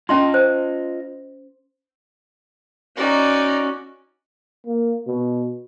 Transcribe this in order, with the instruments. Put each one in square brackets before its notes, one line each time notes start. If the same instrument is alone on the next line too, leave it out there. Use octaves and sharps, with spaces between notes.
[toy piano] C#4 C6 [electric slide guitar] F4 D#5
[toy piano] C5
[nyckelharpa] C#4 F#4 [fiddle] D#4 D5
[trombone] A#3
B2